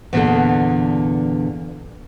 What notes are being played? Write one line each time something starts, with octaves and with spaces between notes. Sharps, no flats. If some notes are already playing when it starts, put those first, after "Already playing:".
E2 A#2 D3 B3 A4